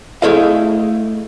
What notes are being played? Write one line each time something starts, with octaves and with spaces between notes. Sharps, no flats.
A3 E4 G#4 A4 D#5 F5